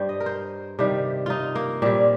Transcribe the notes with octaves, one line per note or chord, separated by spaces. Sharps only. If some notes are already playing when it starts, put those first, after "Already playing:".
Already playing: G2 G3 C5
D#5
A#4
C5
C3 D#3 G3
D#4 F4
A#3
A#2 G3 C4